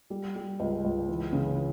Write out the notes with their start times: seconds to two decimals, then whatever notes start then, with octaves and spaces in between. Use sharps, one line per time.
0.10 G3
0.36 G3
0.60 C#2
0.85 C#2
1.09 E3
1.33 C#3